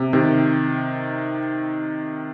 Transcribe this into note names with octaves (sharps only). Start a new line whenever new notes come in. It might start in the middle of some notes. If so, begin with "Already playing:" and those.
Already playing: C3
C3 D#3